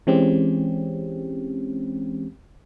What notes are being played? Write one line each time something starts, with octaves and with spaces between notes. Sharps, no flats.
E3 G#3 C4 C#4 G4